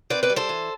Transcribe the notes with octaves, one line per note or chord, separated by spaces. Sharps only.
C4 B4 D5
B4 D5
G3
A4 C5
E3